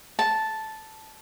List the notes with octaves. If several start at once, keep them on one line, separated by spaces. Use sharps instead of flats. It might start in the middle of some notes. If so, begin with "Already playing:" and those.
A5